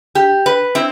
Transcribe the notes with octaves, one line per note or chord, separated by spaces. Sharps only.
G4
B4
C4 E4